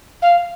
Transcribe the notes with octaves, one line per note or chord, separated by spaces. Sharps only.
F5